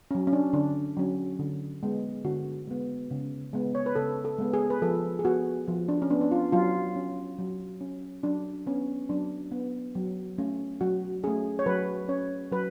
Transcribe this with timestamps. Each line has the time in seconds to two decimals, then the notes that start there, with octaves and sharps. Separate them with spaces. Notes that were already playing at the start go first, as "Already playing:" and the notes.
0.11 F#3 C#4
0.27 C#4
0.33 D4
0.53 D3 D4
0.97 F#3 C#4
1.39 D3
1.83 G#3 B3
2.24 D3 F#4
2.67 G#3 B3
3.11 C#3
3.53 G#3 B3
3.75 C#5
3.86 B4
3.95 C#3 A4
4.25 A4
4.38 G#3 B3
4.53 G#4
4.70 B4
4.82 F3 A4
5.19 G#4
5.25 B3 F#4
5.68 F3
5.88 D4
6.02 C#4
6.10 B3 D4
6.21 D4
6.31 F4
6.52 F#3 F4
6.96 C#4
7.38 F#3
7.81 C#4
8.23 F#3 D4
8.66 B3 C#4
9.09 F#3 D4
9.52 B3
9.95 F#3
10.38 A3 C#4
10.81 F#3 F#4
11.24 A3 C#4 G#4
11.59 C#5
11.66 F#3 B4
12.09 C#4 C#5
12.51 F#3 B4